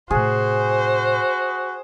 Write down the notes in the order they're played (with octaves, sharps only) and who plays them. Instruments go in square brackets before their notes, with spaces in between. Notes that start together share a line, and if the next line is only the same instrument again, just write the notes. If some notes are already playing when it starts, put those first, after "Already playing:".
[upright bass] A2 C3 [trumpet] F#4 [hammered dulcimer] G#4 [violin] C5